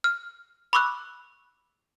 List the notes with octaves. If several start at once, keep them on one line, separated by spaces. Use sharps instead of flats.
F6
B5 C#6 D6 E6 F#6